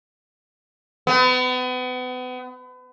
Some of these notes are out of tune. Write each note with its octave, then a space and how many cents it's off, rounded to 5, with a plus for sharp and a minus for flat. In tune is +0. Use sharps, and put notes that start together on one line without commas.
B3 +35